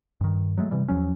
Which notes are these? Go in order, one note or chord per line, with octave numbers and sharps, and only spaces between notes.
G2 D#3
F#3 G#3 A3
C3 E3 G3
E2 F3 F#3 C#4